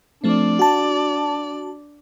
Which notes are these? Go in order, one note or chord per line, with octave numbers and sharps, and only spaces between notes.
F3 A3 C4 D4 D5
F#4 A5